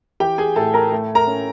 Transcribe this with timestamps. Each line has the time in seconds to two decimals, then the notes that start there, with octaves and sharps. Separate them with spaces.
0.20 E3 G4 G5
0.38 G#4 G#5
0.56 A2 A4 A5
0.74 A#4 A#5
0.92 A3
1.15 A#4 A#5
1.27 C#4